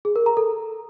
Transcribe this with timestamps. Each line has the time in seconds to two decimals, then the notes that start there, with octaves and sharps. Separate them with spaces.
0.05 G#4
0.16 A#4
0.26 A#5
0.37 A4